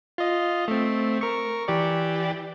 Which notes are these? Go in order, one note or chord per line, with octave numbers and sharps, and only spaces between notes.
F4 D#5
A3 C4
A#4 C#6
E3 G4 D5